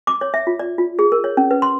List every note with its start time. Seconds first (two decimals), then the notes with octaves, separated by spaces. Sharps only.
0.07 D6
0.21 C#5
0.34 E5
0.47 F4
0.59 D5
0.78 F4
0.99 G#4
1.12 A#4
1.24 C#5
1.37 C#4
1.51 B4
1.62 C6